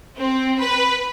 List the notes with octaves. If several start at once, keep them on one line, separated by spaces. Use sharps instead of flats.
C4
B4